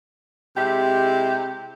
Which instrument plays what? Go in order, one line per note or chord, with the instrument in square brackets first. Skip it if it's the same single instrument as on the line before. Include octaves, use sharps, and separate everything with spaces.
[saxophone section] C3 G#3 E4 G4